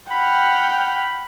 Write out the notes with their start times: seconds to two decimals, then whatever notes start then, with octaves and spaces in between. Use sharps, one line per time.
0.11 F#5 G5 B5 F6